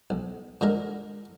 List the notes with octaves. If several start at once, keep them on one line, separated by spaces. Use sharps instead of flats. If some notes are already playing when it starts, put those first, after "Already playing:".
B1
A#2 D3 G#3 A#4